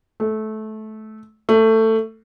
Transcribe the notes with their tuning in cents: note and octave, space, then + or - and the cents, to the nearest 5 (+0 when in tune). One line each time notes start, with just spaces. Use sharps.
A3 -20
A3 +15